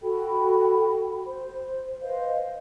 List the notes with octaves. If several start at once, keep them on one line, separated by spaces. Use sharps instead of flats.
F#4 A4 G5 B5
C5
B4 C5 D#5 F5